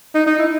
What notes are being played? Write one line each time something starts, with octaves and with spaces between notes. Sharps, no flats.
D#4
D#4
E4